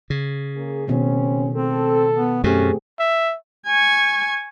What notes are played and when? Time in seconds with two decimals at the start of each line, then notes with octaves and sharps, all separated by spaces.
0.10 C#3
0.55 A#3 C#4 G#4
0.87 B2 D#3 A3 C4 C#4
1.55 C4 A4
2.16 B3
2.44 F#2 B2 A3 C4 C#4 G4 G#4
3.00 E5
3.67 G#5 C#6